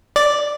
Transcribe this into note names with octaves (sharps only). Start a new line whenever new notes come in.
D5